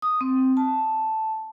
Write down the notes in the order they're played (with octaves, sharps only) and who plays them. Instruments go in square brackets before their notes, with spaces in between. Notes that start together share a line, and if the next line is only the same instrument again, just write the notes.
[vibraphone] D#6
C4
A5